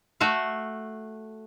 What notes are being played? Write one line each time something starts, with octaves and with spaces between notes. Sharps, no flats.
A3 F#4 E5 F5